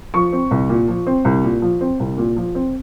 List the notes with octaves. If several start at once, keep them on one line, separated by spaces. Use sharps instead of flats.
F3 C#6
C4
C2
A#2
F3
C4
C2
A#2
F3
C4
C2
A#2
F3
C4